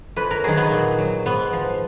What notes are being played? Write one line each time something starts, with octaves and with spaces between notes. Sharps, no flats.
F2 B4
A#4
D#3 F#3 G#4
B3
A#2
F#3
G#2 B3
F3